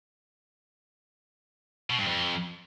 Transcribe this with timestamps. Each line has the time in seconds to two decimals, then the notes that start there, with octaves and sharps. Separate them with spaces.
1.90 B2
1.99 G2
2.07 F2